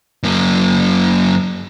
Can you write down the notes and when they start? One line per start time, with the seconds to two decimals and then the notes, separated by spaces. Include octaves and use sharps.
0.23 F#2 A#3